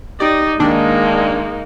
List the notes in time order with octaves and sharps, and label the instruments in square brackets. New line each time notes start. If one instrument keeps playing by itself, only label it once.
[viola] D#4 [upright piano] G4 [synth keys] D5
[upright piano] D#2 [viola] G#3 [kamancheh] A#3 D#4 [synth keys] D4